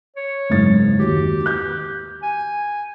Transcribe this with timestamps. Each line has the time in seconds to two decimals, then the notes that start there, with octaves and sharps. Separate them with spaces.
0.16 C#5
0.50 F#1 G#2 A6
0.99 D#2 F#4 G4
1.46 F#6 G6
2.23 G#5